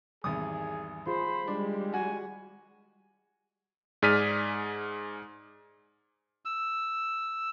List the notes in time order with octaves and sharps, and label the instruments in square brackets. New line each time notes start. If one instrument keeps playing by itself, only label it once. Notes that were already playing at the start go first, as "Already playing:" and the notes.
[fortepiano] G#1 E2 D#6 [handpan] D#3 G3 [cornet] G#4
[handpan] F4 G#4 [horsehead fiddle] C5 [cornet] B5
[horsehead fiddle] G3 G#3 [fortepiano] D4
[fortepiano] F#4 [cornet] G#5
[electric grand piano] G#2 G#4 D5 F6 B6 D#7
[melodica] E6